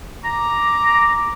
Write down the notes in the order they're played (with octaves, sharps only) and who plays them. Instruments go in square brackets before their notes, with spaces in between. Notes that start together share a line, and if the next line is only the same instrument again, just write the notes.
[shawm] A#5 [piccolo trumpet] D6